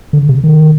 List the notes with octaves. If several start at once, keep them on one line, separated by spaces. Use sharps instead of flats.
D3
C3
D#3